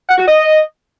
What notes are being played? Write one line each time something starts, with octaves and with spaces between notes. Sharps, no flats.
F#5
F#4
D#5